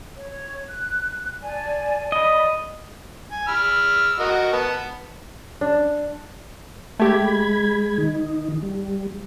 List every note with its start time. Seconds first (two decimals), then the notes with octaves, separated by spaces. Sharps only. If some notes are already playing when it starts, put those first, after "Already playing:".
0.16 C#5
0.68 F#6
1.42 D5 G#5 A5
2.12 D5 D#5 B5
3.31 G#5
3.48 B5 E6 F6
4.20 F#4 A#4 D#5
4.53 B3 A5
5.61 D4
6.99 G#3 A3 G4 B5 G#6
7.98 D#3 D#4
8.62 G3